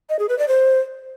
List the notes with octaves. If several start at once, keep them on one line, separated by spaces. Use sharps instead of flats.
D#5
G#4
B4
D5
C5